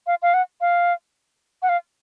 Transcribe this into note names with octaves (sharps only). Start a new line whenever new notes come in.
F5
F5
F#5
F5
F#5
F5